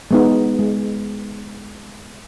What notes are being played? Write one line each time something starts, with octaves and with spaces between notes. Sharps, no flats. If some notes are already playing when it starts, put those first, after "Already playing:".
G#3 B3 D#4
G#3